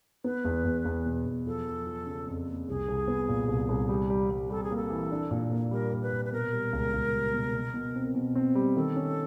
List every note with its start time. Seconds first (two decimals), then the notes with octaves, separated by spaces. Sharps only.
0.24 B3 B4
0.45 E2
0.65 E2
0.85 E2
1.06 B2
1.26 E2
1.46 F3 A4
1.67 F3
1.86 F3
2.06 C#3
2.27 F2
2.48 A#3
2.68 C2 G#4
2.89 C2
3.08 B3
3.28 A#2
3.49 C2
3.69 C2
3.89 G3
4.10 G3
4.30 G3
4.50 G3 A4
4.63 G#4
4.71 A#3
4.76 A4
4.90 E3
5.11 D4
5.31 A#2
5.51 A#3
5.71 G3 A#4
5.92 A#2
6.02 B4
6.12 A#2
6.25 B4
6.32 B2 A#4
6.52 G3
6.73 C#2
6.94 C#2
7.14 G3
7.34 B2
7.55 B2
7.74 B2
7.95 C4
8.15 B2
8.35 C4
8.55 G3
8.76 D#3 A4
8.96 C#4